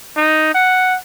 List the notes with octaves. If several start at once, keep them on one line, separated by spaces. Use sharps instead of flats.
D#4
F#5